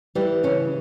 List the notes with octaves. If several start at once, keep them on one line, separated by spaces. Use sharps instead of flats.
E3 G3
C#3 C#4